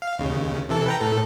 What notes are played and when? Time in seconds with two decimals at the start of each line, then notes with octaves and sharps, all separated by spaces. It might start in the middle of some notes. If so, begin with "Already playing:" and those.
0.02 F5
0.19 D#2 C#3
0.69 C3 E3 A4
0.86 B4 G5 A#5
1.01 A2 A4